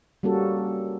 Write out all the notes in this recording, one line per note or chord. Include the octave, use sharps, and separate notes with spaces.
G3 A#3 C#4 F#4 A4